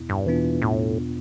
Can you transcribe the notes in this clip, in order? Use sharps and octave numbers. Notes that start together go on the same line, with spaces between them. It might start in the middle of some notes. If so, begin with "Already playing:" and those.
Already playing: E2 B2 B3 E4
G2
E2 B2 E3 B3 D4 F4
A2